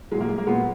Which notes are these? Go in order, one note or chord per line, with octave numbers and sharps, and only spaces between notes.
A#2 F#3 G#3
A#3
G#3
A#3
A#2 F#3 G#3 B3